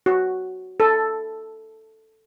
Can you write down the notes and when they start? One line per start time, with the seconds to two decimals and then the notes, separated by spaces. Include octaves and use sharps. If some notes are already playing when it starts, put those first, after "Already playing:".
0.06 F#4
0.80 A4